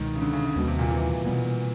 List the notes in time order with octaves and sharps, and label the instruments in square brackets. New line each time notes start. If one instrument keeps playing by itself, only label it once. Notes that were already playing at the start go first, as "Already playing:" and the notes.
Already playing: [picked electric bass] C#2 B2 G#3 [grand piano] D#3
[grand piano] C#3
D3
C#3
C#3
[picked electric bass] D#2 D#3 G3 A#3 [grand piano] B2
[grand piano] C3
A#2
E3
[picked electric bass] B2 G3 B3